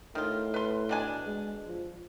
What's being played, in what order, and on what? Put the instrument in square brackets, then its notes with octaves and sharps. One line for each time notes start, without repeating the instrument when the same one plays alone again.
[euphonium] A2 [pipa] D#3 F4
[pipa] B4 C6
B2 D4 G#5
[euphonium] G#3
F3